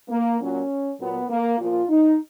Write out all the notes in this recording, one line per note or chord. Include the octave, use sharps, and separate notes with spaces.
A#3
A#2 F#3 C#4
A#2 F#3 B3
A#3
A#2 F3 F4
D#4